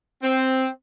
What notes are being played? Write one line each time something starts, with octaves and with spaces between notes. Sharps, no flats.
C4